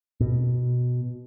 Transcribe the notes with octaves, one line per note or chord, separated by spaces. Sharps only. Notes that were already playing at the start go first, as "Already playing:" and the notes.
B2